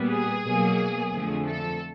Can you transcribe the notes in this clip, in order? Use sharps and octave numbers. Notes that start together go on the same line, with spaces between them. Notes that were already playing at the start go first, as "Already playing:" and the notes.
Already playing: A#2 G3 B3
G#4
B2 F#3 A#3
F2 D3 F3 A3
A4